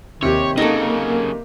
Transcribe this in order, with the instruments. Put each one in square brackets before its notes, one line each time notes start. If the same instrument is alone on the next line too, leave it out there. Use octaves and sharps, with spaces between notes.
[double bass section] D#2 [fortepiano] C3 G4 [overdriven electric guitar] C#5
[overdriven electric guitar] F#2 C#3 [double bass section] A#3 [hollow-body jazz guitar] D#4 A4